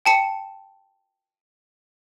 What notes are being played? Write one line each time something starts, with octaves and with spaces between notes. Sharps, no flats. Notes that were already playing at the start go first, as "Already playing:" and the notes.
G5 A5 C#7